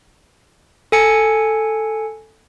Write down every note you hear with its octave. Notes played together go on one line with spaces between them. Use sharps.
A4 G#5 C#7